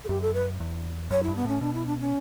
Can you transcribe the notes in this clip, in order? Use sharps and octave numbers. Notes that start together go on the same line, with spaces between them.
A4
F#2 G4
A4
B4
E2
F#2 C#5
E4
G2
B3
A2 C#4
B2 D4
E4
D4
C#4